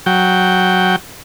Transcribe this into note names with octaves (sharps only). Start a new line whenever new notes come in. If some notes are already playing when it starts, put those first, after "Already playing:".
F#3 G5